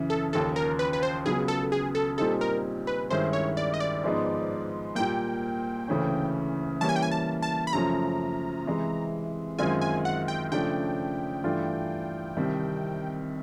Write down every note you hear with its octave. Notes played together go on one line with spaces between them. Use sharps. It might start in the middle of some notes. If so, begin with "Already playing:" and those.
Already playing: F#2 C#3 E3
A4
D#2 C#3 F3 A4
A#4
B4
B4
C5
C#2 C#3 F#3 B3 G#4
A4
G#4
A4
A#2 G3 C4 D#4 G4 A4
A#4
B4
G2 D#3 G#3 C#4 E4 C5
C#5
D5
D#5
D5
G#2 F3 G#3 B3 D#4
A#2 G3 A#3 G5
D2 C#3 E3 A3 C#4
E3 G3 A#3 C#4 A5
G#5
G5
G#5
A5
A5
B5
F#2 C#3 F3 A3 C#4 A#5
C3 E3 G#3
F#2 D#3 G#3 C4 F4 G#5
G#5
F#5
G5
C#3 F3 A3 D4 G5
G2 E3 A3 D4 F4
C2 C3 D#3 G3